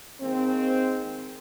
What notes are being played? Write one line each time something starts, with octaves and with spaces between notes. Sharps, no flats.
D#3 G#3 A#3 C4